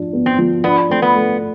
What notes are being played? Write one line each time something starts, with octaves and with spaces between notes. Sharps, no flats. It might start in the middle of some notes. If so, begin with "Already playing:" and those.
Already playing: F3 D4
B3
C4
F3
B3 D4
A3 C4
B3
A3